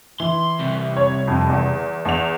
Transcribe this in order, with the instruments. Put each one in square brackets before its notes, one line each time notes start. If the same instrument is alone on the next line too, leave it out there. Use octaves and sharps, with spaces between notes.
[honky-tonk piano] E3 [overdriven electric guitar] C6
[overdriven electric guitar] C2 C3
[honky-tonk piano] C#5
F2
E2
E2 F7